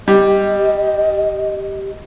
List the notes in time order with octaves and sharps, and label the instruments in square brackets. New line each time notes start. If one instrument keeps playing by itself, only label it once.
[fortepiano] G3 [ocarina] G4 [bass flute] D#5